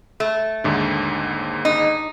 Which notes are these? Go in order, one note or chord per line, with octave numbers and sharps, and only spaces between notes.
A3
D#2 G#2 D3
D#4